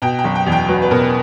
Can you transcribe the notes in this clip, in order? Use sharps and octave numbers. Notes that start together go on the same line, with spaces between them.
B2 G5
G5
F#1
G5
E2
G5
F#3 B4
B4
B2 A#4